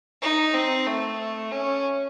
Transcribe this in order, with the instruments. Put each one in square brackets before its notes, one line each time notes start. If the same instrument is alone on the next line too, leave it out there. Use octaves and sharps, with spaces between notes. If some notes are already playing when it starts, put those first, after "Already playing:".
[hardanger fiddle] D#4
C4
A3
C#4